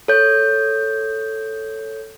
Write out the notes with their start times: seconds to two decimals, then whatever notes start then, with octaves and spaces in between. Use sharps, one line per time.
0.08 A4 C#5 G6